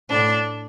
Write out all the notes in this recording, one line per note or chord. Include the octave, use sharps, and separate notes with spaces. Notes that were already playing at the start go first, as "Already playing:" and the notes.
A2 D4